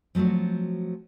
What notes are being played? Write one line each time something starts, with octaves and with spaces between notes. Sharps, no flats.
F3 F#3 A3 C4 F#4